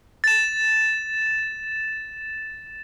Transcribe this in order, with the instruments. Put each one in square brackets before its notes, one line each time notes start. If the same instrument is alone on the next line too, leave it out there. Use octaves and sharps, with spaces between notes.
[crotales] A6 E7